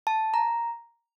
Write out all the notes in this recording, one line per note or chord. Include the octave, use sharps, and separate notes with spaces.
A5
A#5